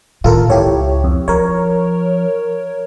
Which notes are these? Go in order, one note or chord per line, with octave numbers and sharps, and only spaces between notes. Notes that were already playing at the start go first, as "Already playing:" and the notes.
A2 D#3 F4 A4 A#4
C#2 E4 G4 C#5
F2
F3 A#4 C#5